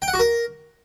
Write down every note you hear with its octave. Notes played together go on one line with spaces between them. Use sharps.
G5
F#5
F#4
A#4